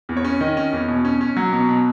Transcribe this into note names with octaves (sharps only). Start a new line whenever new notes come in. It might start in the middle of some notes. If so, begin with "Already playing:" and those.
E2
C#5
C#4
D#3 D#5
C#4
E2
B2
C#4
C#4
F#3
B2
B2